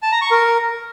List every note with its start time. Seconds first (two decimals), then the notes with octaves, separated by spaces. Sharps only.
0.02 A5
0.12 A#5
0.22 C#6
0.31 A#4